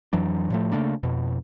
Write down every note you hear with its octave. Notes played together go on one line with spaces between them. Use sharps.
F2 E3 F#3 D4
A2 F3 A3
C#3 A3 A#3 D4
F2 B2